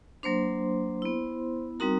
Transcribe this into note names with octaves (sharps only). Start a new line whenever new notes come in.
F#3 A#3 D4 C5 C6
B3 E4
G3 C4 D#4 F#4 A#4 A#5